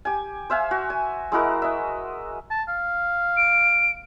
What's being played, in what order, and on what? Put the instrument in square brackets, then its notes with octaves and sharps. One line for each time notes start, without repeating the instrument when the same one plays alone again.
[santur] G4 G#5
C5 E5 F5 G#5
F#4
G#5
G#3 E4 F#4 A#4
D#5 E5
[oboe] A5
F5
[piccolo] D7